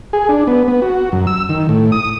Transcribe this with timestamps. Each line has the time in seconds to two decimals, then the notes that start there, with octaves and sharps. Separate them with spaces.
0.13 G#4
0.29 D4
0.47 B3
0.68 B3
0.82 F#4
1.12 F#2
1.27 E6
1.49 D#3
1.69 A2
1.92 D#6